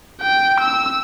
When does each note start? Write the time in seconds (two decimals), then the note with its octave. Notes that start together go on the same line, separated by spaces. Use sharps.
0.21 G5
0.60 E6